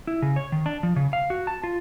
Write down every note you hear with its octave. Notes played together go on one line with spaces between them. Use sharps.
E4
C#3
C#5
D#3
D4
F3
C#3
F5
F#4
A5
F4